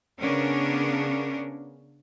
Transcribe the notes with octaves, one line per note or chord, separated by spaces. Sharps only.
C#3 B3 C#4 D4 A#4